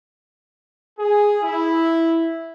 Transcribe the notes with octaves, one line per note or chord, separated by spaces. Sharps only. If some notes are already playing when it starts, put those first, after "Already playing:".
G#4
E4